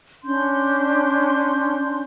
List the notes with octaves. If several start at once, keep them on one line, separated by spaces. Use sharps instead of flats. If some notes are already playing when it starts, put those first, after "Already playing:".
C#4 D4 C6 G6